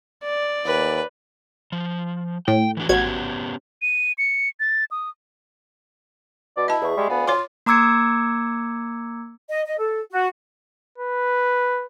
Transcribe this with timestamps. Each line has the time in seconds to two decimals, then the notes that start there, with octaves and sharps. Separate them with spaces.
0.25 D5
0.65 D#2 B4
1.72 F3
2.48 A2 G5
2.77 E3 D4 F#4
2.89 A1 B3 C#4 F#4 G4 G#6
3.82 D#7
4.18 C#7
4.60 A6
4.91 D#6
6.57 B2 D5
6.68 E4 D#5 A5
6.82 E2 G#4 E5 C#6
6.97 G3 G#3
7.10 D2 B3 D5 F5 G#5
7.28 F4 C#5 C6 D6
7.66 A#3 A#5 D6 E6 G#6 C#7
9.49 D#5
9.67 D#5
9.78 A4
10.11 F#4
10.98 B4